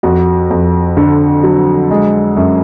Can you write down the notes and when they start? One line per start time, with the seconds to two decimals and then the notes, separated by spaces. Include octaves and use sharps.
0.03 F2 F#4
0.51 F2
0.97 D3
1.43 F#3
1.91 G#3
2.37 F#2